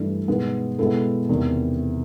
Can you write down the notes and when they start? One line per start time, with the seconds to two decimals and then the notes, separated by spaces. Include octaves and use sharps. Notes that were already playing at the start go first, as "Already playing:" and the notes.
Already playing: G2 E3 A3 D4
0.28 B2 G#3 B3 D#4
0.78 B2 G#3 B3 E4 A4
1.29 E2 C3 D#3